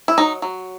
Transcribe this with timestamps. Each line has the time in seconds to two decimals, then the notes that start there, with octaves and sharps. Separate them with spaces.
0.08 E4
0.18 F#3 D#4
0.42 F#3